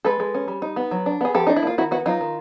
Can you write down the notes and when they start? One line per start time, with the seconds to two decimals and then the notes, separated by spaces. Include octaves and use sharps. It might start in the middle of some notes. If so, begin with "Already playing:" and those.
0.05 G#3 A4 B4
0.20 G#3
0.34 C#4
0.48 G3
0.62 D#4
0.76 B3
0.91 F#3
1.06 D4
1.21 B3 G#4
1.34 F3 G4 A4
1.47 D4 D#4
1.57 E4
1.63 A#3 F4
1.78 D#3 E4 F#4
1.91 B3 E4 F#4
2.06 F#3 D#4 F4
2.21 D#3